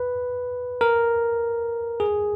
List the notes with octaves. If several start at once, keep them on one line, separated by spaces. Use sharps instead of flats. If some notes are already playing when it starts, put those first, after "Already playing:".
Already playing: B4
A#4
G#4